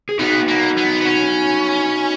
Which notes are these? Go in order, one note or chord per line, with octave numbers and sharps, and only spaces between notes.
G#4
B3 D#4 F#4
A#3
B3
B3
C#4